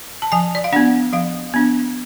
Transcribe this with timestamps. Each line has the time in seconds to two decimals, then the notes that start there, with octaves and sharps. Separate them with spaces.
0.22 A5
0.32 F3 G#5
0.55 D5
0.64 F5
0.73 B3 D4 F#5
1.13 F3 F5
1.54 B3 D4